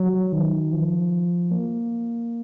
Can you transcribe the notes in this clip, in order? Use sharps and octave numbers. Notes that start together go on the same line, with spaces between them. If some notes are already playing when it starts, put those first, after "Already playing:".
Already playing: F#3
D#3
F3
A#3